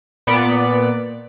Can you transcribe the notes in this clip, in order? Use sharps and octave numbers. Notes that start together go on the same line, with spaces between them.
A#2 B3 D5 B6